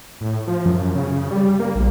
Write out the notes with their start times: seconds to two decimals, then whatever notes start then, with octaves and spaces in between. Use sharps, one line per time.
0.21 A2
0.47 F3
0.66 F#2
0.95 C#3
1.31 G3
1.60 A#3
1.75 A#1